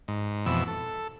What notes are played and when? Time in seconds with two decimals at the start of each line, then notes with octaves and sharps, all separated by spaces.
0.08 G#2
0.46 F2 B2 E3 E6
0.67 A4